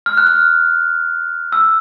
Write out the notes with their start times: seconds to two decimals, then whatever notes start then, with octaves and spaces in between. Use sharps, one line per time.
0.06 F6
0.17 F#6
0.27 F6
1.52 E6